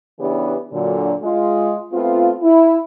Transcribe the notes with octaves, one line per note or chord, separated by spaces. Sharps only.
C#3 E3 B3 D4 G4
A#2 D3 F#3
G#3 F4
A3 B3 C4 F4
E4